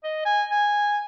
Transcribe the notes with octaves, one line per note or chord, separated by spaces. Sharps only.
D#5
G#5
G#5